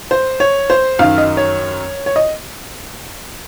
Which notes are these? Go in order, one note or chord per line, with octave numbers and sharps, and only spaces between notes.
C5
C#5
C5
F#2 D#3 F5
D#5
C#5
C#5
D#5